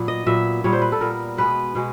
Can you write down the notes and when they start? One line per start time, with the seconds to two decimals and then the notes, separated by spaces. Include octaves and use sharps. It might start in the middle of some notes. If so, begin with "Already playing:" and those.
Already playing: A#2 F#3 B3
0.08 D#5
0.26 A#2 F#3 B3 E5
0.64 A#2 G3 B3 C#5
0.73 C5
0.82 B4
0.92 A4
1.01 A#2 G3 B3 A#4
1.37 B2 G#3 B3 B4
1.75 B2 G#3